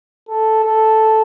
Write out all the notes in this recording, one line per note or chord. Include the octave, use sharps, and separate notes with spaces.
A4
A4